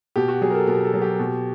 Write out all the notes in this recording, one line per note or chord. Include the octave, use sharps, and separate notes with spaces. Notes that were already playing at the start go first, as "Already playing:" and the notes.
B2 G4
F#4
F#3 G#4
A#4
A4
B2 A#4
A4
F#3
G4
B2